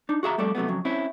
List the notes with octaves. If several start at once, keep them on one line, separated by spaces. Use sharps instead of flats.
D4 D#4
F#4 G#4 E5 A#5
F2 G3 A3 A4 D5
C3 F#3 A3 B3
F2 C#3 F#3
C4 C#4 E4